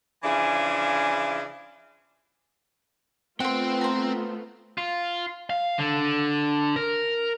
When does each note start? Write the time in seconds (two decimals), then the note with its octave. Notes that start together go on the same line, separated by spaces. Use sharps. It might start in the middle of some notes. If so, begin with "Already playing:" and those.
0.23 C#3 E3 F3 D4 E4 G#4
3.40 A3 B3 C4 F4 C5 F#5 G5
3.81 C5 A#5
4.78 F4
5.50 F5
5.78 D3
6.76 A#4